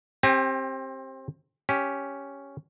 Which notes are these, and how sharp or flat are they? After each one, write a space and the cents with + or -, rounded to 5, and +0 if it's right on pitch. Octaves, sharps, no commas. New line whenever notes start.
C4 +25 G4 +0 G#5 +0
C#4 +0 G4 +0